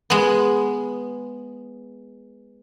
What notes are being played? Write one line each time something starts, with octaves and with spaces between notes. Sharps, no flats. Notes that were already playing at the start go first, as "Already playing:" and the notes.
G#3 B3